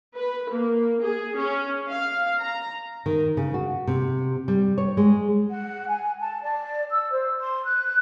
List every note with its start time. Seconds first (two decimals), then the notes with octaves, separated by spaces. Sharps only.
0.16 B4
0.50 A#3
1.02 G#4
1.37 C#4
1.90 F5
2.41 A#5
3.06 D#3
3.37 C#3
3.54 F#4
3.87 C3
4.48 G3
4.78 C#5
4.97 G#3
5.50 F#5
5.87 G#5
6.21 A5
6.42 D5
6.92 E6
7.11 C5
7.40 C6
7.64 F#6